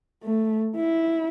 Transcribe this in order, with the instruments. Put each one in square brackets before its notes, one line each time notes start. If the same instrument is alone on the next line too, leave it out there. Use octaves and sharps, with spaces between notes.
[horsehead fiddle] A3
E4